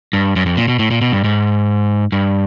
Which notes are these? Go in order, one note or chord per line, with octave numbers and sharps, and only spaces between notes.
G2
F#2
F2
A#2
B2
A2
A#2
B2
G2
G#2
G2